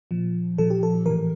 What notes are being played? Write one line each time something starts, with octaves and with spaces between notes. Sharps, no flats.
A#2 F3
A#2 F3 A4
G4
A4
A2 E3 A#4